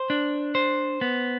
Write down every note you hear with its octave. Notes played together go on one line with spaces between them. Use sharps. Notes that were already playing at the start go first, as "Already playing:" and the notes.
Already playing: C5
D4
C5
B3